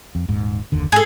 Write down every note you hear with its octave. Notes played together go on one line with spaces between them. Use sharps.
F2
D#1 G#2
F#1 D#2 D3
G#2 G#4 A4